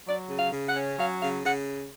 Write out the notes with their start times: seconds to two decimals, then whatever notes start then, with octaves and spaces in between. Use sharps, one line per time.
0.06 F#3 D5
0.29 C#3
0.37 F5
0.51 C#3
0.67 F#5
0.75 C#4
0.98 F#3 F5
1.20 C#3 F5
1.44 C#3 F#5